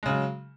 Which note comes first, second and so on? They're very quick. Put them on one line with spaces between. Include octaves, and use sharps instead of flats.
G#3 C#3 F#3